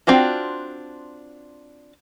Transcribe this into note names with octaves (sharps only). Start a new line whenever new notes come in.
C4 D4 F4 F#4